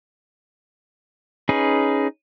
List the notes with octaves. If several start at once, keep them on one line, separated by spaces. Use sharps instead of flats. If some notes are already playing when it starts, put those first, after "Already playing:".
C#4 D#4 G#4 B4